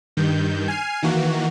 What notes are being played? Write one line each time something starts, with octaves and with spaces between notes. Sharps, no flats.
G2 D#3 G6
G#5 F6 C7 D#7
D#3 E3 A#3 F#4